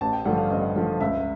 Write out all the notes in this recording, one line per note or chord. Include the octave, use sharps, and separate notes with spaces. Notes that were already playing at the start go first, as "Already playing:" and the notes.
A1 A5
G5
G2 D3 F3 F#5
F5
A1 D#5
G2 D3 F3
C#2 E5